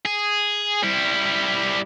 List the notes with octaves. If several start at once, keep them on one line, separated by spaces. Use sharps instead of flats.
G#4
G3 E4